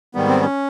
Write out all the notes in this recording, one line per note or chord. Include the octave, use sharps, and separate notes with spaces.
G#2 D#3 G3 B3
C4
C#4